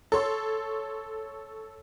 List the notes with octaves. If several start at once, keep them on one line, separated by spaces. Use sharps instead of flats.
A4 C#5 C6